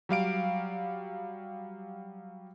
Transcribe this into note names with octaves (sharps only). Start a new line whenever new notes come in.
F#3 G3 F5 D7